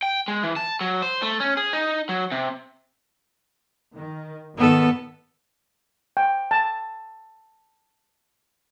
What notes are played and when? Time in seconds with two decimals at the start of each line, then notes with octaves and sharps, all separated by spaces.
0.03 G5
0.28 G#3
0.43 E3
0.56 A5
0.81 F#3
1.02 C5
1.22 A3
1.40 C#4
1.57 G#4
1.73 D#4
2.09 F#3
2.32 C3
3.95 D#3
4.57 G#1 D#3 B3 A4
6.17 G5
6.51 A5